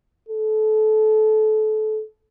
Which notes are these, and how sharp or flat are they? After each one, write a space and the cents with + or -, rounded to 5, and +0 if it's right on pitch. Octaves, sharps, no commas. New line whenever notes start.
A4 -25